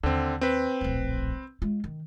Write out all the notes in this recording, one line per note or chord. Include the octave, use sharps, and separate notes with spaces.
D#2 D3 C4
C4 B4
D1 A#1
G#3 F4
D#3